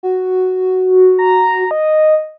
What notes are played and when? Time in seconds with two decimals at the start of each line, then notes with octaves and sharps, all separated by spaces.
0.03 F#4
1.19 A#5
1.71 D#5